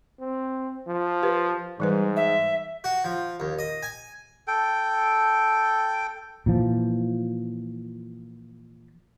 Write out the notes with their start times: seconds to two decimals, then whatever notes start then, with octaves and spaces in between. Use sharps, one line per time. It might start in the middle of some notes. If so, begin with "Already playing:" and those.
0.20 C4
0.88 F3
1.23 G4 B4
1.80 G#2 E3 G3 B4
2.16 E5
2.84 F#4
3.05 F3
3.40 D#2
3.59 D#5
3.83 G#5
4.47 A4 G5
6.46 A#2 E3 F3